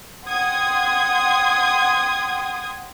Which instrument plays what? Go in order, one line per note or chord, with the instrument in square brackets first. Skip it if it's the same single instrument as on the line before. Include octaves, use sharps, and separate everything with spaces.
[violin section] F#5 G5 C6 D#6 G#6